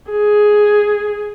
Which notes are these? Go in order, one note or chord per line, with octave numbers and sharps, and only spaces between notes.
G#4